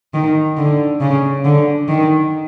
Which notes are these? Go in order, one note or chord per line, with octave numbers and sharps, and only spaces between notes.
D#3
D3
C#3
D3
D#3